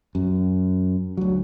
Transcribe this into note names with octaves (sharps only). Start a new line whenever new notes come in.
F#2
D2 F#3